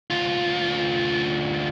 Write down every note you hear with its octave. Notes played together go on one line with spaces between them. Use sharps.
D2 F4